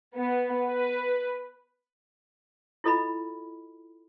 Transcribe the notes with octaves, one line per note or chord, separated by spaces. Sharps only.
B3
B4
E4 F4 A4 D#5 A#5 B5